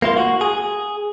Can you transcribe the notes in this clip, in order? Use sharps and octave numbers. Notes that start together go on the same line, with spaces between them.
A#3 E4 F4
F#4
G#4